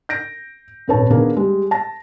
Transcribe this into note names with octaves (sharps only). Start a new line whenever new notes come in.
G6 A#6 D7
D#1 G#1 B4 C#5 A5
D#3 A#3 B3 D4 G#4 A#4
G3 G#3
A5 A#6